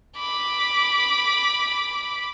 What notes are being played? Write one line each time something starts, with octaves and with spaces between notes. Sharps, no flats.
B5 D6